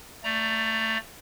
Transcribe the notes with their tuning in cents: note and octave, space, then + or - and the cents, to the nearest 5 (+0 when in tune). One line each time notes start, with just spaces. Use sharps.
A3 +20 D5 +5 A#5 +5